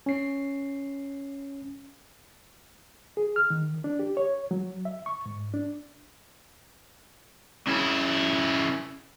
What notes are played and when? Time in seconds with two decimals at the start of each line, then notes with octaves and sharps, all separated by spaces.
0.06 C#4 C7
3.17 G#4
3.36 F6
3.50 D#3
3.84 D4
3.99 G4
4.17 C#5
4.51 F#3
4.85 E5
5.06 C#6
5.26 G#2
5.54 D4
7.67 C#3 E4